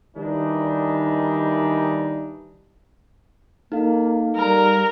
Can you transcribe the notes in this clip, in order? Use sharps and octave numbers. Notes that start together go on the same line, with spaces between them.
D#3 E3 G3 D4 D#4
A#3 D#4 A4 F5
G3 A#4